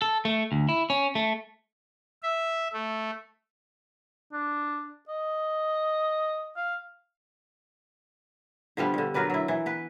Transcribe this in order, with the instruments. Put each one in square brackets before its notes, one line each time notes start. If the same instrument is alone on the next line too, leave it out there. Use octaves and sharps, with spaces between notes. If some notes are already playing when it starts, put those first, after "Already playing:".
[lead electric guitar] A4
A3
D2
E4
C#4
A3
[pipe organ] E5
A3
[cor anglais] D4
D#5
F5
[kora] D3 F3 G3 B3
G2 D3
F#3 A#4 B4 D5
F#3 E4
E3
B3 B4